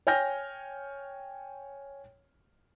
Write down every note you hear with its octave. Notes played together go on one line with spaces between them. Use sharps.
C#5 G5 G#5 F6 G6 A#6